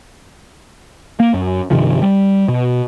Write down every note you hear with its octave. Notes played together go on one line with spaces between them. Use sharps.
A#3
F#2
G2 C3 D#3 F3
G3
B2